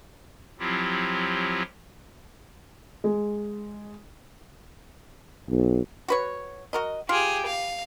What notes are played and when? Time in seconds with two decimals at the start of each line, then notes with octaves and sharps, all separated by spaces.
0.59 F3 F#3 C4 E4 F4 G4
3.04 G#3
5.50 B1
6.08 F#4 B4 C#5
6.73 F#4 A#4 D#5
7.09 F4 G4 G#4
7.47 F5